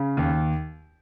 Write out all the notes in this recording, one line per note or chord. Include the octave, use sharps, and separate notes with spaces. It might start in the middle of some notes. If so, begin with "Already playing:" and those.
Already playing: C#3
D#2